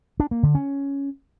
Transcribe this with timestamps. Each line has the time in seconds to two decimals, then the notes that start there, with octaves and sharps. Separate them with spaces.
0.20 D4
0.31 A#3
0.43 D3
0.55 C#4